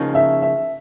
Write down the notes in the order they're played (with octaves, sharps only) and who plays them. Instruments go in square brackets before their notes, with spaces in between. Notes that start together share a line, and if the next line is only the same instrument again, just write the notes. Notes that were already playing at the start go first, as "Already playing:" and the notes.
Already playing: [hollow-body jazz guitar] C#3 F3 A#3 D#4
[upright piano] E5
E5